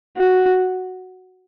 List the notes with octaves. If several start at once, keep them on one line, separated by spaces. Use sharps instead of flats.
F#4